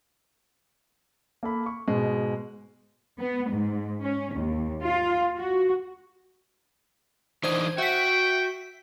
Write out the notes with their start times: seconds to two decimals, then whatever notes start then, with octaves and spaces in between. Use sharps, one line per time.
1.43 A#3 A4 B5
1.66 C#6
1.87 G#2 B2 G#3
3.19 B3
3.51 G#2
4.02 C#4
4.35 D#2
4.83 F4
5.37 F#4
7.44 E3 D4 D#4 C5 G#6
7.78 F#4 E5 G5 B6